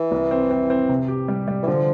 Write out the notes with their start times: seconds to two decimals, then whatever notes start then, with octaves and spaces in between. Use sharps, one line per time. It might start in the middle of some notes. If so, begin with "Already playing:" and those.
Already playing: E3
0.11 C2
0.31 C4
0.51 C4
0.70 C4
0.89 C3
1.08 G4
1.28 G3
1.48 G3
1.63 E3
1.67 D3 F3